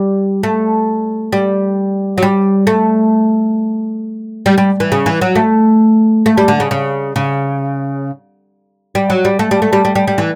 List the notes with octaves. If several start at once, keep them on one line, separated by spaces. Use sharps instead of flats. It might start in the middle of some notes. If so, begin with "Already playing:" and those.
Already playing: G3
A3
G3
F#3
G3
A3
G3
G3
E3
C#3
E3
F#3
A3
A3
G3
D3
C#3
C#3
C#3
G3
F#3
G3
A3
G3
A3
G3
G3
G3
G3
E3